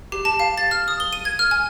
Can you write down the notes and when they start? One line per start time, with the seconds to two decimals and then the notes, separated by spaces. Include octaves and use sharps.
0.12 G4
0.25 A5
0.40 F5
0.57 A6
0.71 F6
0.88 D#6
1.00 G7
1.13 D#7
1.25 G#6
1.39 F6
1.51 G#5